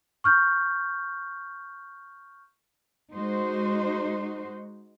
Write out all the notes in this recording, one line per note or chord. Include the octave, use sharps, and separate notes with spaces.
C#6 F6 G6
G#3 D#4 F#4 C5